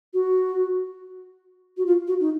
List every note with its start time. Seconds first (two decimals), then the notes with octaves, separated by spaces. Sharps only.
0.14 F#4
1.78 F#4
1.86 F4
2.08 F#4
2.20 D#4